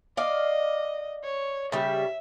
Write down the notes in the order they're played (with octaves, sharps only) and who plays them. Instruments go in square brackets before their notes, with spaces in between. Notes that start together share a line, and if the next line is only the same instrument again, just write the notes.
[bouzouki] D5 F5 [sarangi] D#5
[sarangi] C#5
[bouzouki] C#3 G3 [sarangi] E5